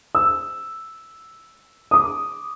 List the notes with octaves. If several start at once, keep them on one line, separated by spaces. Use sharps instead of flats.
E6
D6 D#6